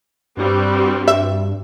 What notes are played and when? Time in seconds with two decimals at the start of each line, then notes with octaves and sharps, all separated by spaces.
0.37 G2 G3 C4 F#4
1.08 E5